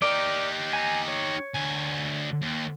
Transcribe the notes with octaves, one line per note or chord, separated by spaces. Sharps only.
D#4 G4 A#4 D5
G#5 A#5
C#5
D2 G#5
D#2